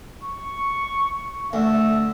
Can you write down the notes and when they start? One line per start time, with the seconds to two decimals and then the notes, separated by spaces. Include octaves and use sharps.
0.24 C#6
1.53 D2 E5